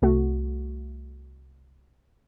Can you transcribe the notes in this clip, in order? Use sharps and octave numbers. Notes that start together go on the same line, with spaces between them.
C2 A3 F#4